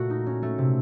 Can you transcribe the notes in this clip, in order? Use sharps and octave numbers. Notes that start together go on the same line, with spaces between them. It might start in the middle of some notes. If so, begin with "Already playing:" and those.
Already playing: A#2 A3 F#4
D#4
C#4
A3
C3